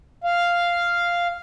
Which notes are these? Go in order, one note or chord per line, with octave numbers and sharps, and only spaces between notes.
F5